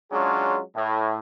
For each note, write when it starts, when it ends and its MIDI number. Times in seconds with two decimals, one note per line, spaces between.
0.12 0.59 54
0.12 0.59 56
0.12 0.59 61
0.12 0.59 62
0.12 0.59 65
0.12 0.59 68
0.76 1.19 45